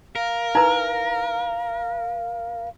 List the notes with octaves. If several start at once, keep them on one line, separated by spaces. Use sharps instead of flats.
A#4 F5
D#4 E4 B4 A#5